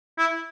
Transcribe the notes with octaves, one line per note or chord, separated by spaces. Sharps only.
E4